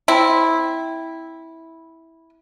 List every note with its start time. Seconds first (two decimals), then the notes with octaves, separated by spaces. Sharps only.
0.08 C4 E4